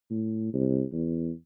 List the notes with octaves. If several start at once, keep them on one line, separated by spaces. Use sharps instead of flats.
A2
C2
E2